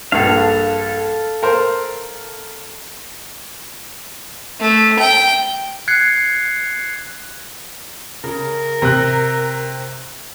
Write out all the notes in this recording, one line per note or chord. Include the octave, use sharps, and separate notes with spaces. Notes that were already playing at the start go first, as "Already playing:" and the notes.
A#1 G2 A4 F5
A#4 C5
A3
G5
F#6 G#6 C7 C#7
C#3 A#4
C3 A#5 F#6